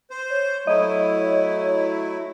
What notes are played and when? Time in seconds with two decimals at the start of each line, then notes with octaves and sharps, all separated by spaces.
0.10 C5
0.30 C#5
0.67 F#3 A3 E4 D#5